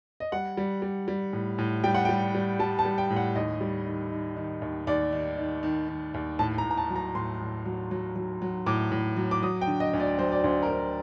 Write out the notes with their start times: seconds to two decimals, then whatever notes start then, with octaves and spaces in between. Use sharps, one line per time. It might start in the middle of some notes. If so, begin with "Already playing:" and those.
0.20 D#5
0.32 G3 F#5
0.57 G3
0.82 G3
1.08 G3
1.33 A2
1.58 A2
1.84 G3 G5
1.95 F#5
2.05 G3 G5
2.34 G3
2.59 G3 A5
2.79 A5
2.85 G3
2.98 G5
3.10 A2
3.16 F#5
3.35 D#2 D#5
3.61 G3
3.86 D#3
4.11 D#3
4.36 D#3
4.62 D#2
4.87 D#2 D5
5.12 D#3
5.38 D#3
5.63 D#3
5.89 D#3
6.14 D#2
6.39 A2 A5
6.58 A#5
6.64 A2
6.71 A#5
6.77 A5
6.90 F#3
6.96 A#5
7.15 A2 C6
7.40 A2
7.65 F#3
7.91 F#3
8.16 F#3
8.42 F#3
8.66 A2 D6
8.92 A2
9.17 F#3
9.31 D6
9.43 F#3 D#6
9.61 G5
9.67 D3
9.80 D#5
9.93 D2
10.00 D5
10.19 F#3 C5
10.32 D5
10.44 D2 C5
10.63 A#4
10.69 D2 C5